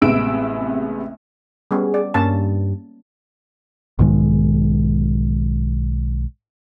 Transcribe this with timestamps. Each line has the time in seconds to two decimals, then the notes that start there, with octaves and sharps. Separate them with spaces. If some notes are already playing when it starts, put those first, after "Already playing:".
0.01 A1 C3 G#3 B3 E6 D7
1.71 G3 B3 C#4 G#4
1.94 D5
2.14 G2 A#3 C#4 A5
3.99 B1 G#2 D#3 G#3